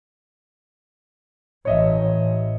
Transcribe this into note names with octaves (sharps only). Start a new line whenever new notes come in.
A1 C#5 D#5 E5